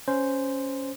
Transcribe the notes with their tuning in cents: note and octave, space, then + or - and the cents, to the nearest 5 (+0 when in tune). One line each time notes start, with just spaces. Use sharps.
C#4 +0 C5 -5